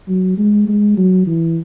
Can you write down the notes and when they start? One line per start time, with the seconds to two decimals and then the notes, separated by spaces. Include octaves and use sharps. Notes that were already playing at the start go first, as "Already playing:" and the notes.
0.09 F#3
0.38 G#3
0.68 G#3
0.97 F#3
1.27 E3